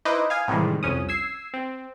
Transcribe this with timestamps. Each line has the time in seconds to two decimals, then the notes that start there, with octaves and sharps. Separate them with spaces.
0.05 D#4 E4 B4 C5 D#5 D6
0.30 F5 G#5 D#6
0.48 A2 C3 D#3 E3 G3 G#3
0.83 C2 F2 C#4 D#6
1.09 E6 G#6 C7
1.54 C4